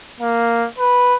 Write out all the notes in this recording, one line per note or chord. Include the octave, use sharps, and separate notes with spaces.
A#3
B4